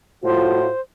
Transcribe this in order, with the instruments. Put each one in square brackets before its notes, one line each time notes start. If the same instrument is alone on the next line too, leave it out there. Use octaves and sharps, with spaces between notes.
[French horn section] A2 F4 F#4 [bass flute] C5